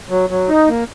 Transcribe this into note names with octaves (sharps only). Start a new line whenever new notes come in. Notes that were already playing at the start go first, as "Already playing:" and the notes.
F#3
F#3
D#4
A#3